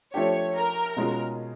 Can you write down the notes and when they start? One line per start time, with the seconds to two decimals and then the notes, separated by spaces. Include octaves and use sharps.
0.14 F3 A3 D4 G4 C#5
0.56 A#4
0.97 B2 G#3 C#4 F4 G#4